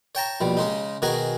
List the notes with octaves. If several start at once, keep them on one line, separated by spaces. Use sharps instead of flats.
C#5 G5 A5 A#5
A#1 B2 G3
C#3 G#3 D#4
B2 D#3 F#4 G#4 G#5 A#5